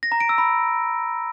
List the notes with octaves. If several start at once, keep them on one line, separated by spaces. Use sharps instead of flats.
A#6
A#5
D7
E6
B5